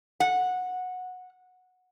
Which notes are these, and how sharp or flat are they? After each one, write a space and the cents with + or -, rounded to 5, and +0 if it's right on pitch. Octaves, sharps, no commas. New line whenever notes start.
F#5 -15